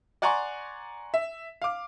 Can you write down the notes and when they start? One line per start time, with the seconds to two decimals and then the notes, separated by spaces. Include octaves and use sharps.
0.22 D5 F#5 G#5 A#5 C6 C#6
1.14 E5
1.62 F5 D6